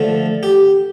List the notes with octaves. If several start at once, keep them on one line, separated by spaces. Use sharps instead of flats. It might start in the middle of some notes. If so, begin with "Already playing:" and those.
Already playing: D3 F3 A3 A4
G4